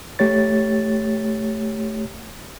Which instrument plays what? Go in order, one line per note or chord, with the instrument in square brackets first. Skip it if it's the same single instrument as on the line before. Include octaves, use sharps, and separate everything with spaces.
[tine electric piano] A3 G4 C#5 A6